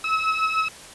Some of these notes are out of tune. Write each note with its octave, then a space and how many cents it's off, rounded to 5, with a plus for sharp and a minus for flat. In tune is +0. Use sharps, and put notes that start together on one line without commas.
E6 -35